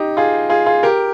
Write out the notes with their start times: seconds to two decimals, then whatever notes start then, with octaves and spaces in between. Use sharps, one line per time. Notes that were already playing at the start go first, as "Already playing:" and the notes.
Already playing: D#4 G4
0.17 F4 G#4
0.50 F4 G#4
0.66 F4 G#4
0.83 G4 A#4